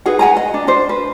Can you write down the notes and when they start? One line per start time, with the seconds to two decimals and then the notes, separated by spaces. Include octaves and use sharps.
0.06 D#4 G#4 B4 F#5
0.19 F#5 G#5 A#5
0.37 D#5
0.54 D4
0.67 D4 C5
0.89 B4